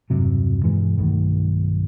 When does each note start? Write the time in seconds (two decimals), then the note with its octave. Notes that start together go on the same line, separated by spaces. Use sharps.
0.10 E1 G2 C3 F#3
0.64 G2 B2 E3 G#3
0.98 B1 G2 D#3 A3